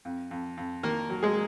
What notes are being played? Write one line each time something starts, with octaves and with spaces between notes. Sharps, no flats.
F2
F2
F2
D#3 A#3 A#4
F#3
G#3 G#4